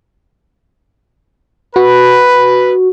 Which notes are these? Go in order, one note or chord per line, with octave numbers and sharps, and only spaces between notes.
F#4 B4